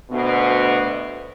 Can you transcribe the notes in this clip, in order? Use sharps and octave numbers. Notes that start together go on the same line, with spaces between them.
D2 B2